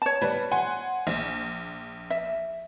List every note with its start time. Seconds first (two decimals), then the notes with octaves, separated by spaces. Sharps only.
0.02 C#5 A5
0.22 G3 B4
0.52 F#5 G#5 C6
1.07 A#1
2.10 E5